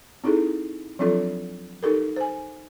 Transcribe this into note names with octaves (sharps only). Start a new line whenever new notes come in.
C4 D#4 E4 G#4 A4
F3 F#3 C4 D4 F4 A4
D#4 G4 A4 A#4
C5 G#5